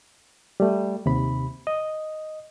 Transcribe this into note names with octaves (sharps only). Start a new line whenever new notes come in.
G3 A3
D#2 C3 B5
D#5